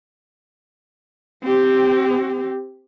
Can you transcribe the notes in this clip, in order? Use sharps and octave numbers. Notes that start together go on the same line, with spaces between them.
C4 G4